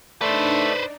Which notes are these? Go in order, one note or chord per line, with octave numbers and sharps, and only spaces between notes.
A3 D4 D#4 B4 C5 D5